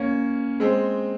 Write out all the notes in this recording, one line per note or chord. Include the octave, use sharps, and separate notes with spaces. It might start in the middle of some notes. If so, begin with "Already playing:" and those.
Already playing: A#3 C#4
G#3 C4